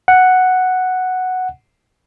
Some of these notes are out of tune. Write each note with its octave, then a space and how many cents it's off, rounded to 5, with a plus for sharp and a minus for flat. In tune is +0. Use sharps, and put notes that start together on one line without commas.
F#5 +0